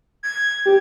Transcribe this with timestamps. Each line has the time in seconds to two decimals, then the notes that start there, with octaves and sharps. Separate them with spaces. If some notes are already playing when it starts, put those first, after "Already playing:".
0.23 G#6
0.66 G4